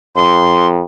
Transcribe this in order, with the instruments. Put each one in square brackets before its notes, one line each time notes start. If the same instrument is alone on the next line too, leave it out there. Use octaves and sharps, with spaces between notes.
[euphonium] F2 [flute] C6